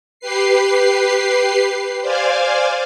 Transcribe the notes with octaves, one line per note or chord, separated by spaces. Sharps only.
G4 B4 C7
C5 D5 F5 G#5